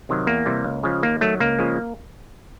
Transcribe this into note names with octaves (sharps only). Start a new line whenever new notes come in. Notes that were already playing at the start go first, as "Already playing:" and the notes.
C3 D#3 F#3
E2 A#3
C3 E3 G3
C#2
C#3 F3 G#3
D#2 A#3
D#3 F#3 A3
C#2 A#3
C#3 F3 G#3